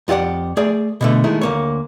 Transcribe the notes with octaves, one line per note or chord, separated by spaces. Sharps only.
F2 F4 G4 D5 F#5
A3 G#4 D5
B2 D3 A3
D#3 G#3 A3 E4
D2 A#3 C#5